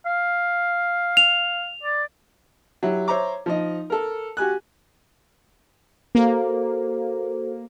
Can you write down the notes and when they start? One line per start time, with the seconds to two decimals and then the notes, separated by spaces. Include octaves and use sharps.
0.06 F5
1.17 F7
1.83 D5
2.83 F#3 E4 G4
3.08 C5 C#5 E5 A#5 D6
3.46 F3 D#4 D#5
3.90 A4 A#4
4.37 F#4 G4 G#5 F#6
6.15 A#3 F#4 A4 C5